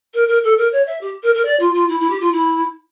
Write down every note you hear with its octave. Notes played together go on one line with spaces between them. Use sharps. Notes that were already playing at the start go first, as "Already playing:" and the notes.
A#4
A#4
A4
A#4
C#5
E5
G4
A#4
A#4
D5
F4
F4
E4
E4
G4
F4
E4